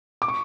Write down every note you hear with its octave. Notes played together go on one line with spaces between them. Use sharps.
D6
C#6